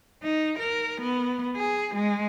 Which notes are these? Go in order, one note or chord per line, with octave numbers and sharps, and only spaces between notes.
D#4
A#4
B3
G#4
G#3